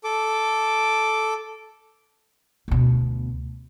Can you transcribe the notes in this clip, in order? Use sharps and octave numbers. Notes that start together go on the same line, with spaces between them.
A4 D6
D2 B2